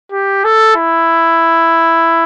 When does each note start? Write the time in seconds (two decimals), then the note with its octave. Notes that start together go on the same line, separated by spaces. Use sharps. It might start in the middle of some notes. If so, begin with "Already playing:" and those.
0.12 G4
0.44 A4
0.76 E4